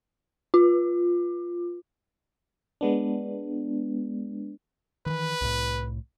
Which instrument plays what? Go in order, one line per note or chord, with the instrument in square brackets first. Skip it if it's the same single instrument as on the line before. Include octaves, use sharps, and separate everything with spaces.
[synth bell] F4
[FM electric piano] G#3 B3 D4
[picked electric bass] D#3 E3 [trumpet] B4
[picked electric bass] C2 A2